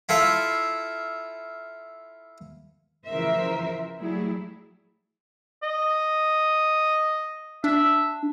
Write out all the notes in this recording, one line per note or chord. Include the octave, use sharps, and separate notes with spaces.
E4 F4 A4 E5 F5
C#3 E3 F3 A#4 C5 E5
F#3 G3 A3 E4 G#4
D#5
D4 E5